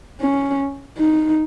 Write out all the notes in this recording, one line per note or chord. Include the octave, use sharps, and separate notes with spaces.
C#4
D#4